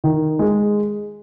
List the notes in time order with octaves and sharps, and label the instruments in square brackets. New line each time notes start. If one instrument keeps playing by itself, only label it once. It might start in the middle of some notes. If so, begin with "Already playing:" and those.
[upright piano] D#3
G#3